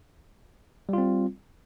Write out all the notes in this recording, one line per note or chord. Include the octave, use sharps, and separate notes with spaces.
G3 C4 F4